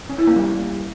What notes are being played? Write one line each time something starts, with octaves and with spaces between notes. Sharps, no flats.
C#4
E4
A#3
G3